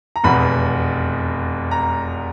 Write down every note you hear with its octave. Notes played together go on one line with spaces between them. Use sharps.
A#5
F1 E2 B2 B5
A#5